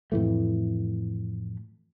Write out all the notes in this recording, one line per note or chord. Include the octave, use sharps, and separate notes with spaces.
F2 A2 E3 A3